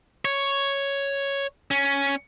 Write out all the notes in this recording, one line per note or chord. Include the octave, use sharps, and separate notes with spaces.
C#5
C#4